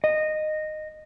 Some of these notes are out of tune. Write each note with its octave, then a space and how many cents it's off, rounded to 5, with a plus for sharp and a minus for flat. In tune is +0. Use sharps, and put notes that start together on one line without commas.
D#5 -15